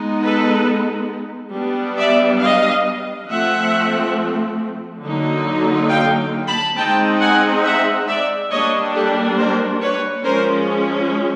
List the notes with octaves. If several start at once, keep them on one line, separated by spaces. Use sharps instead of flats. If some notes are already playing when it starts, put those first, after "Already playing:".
Already playing: G#3 B3 D#4
A4 B4
G3 B3 D4
D5 E5
D#5 F5
F3 A3 C4 E5 F#5
D3 F#3 A#3 D#4
F5 G5
A5 B5
G#3 C4 D#4 G5 A5
F#5 G#5
E5 F#5
D5 E5
G3 A#3 D4 C#5 D#5
G4 A4
A#4 C5
B4 C#5
F3 G#3 C#4 A#4 C5